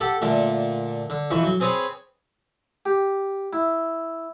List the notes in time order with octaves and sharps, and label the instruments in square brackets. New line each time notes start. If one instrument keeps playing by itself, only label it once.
[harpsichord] G4 A4 F#5
A#2 D3 A3
D3
F2 E3 C#6
F#3
C4 G#4 B4 C#5
G4
E4